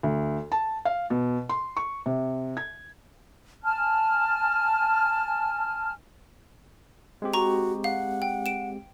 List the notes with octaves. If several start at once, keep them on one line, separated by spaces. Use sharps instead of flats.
D2
A5
F5
B2
C6
C#6
C3
G#6
G#5 A5 F6
G#3 C4 G4
F#4 A#5 C#6
F5 F#5
G5
D7 E7